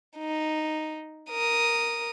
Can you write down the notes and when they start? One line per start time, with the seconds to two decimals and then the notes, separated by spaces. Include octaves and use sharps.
0.18 D#4
1.30 A#4 D#6